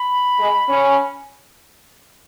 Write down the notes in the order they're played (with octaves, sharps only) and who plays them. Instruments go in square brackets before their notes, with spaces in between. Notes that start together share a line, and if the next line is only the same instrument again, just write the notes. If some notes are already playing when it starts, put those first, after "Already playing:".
Already playing: [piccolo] B5
[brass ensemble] G#3
C#4